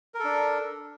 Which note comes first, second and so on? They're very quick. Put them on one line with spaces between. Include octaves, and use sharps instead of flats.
A#4 A4 D4